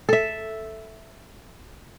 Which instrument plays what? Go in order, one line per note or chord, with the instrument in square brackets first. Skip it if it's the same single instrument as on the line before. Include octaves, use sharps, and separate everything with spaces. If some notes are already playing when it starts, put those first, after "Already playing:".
[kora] A4 E5